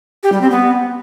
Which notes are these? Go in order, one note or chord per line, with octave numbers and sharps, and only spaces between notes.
G4
G3
C4
B3